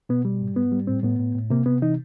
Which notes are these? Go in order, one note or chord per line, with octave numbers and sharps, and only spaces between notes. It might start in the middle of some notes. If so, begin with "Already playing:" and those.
B2 B3
G3
G#2
G#2 B3
G3
A2 C4
A2 B3
A2
A2
C3 A#3
C3 B3
E3 D#4